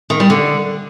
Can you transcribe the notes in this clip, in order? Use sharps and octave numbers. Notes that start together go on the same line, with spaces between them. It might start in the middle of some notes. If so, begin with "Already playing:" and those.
D#3
G3
D3